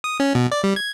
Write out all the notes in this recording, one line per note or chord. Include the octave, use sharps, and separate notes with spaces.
D#6
C#4
B2
D5
G3
G#6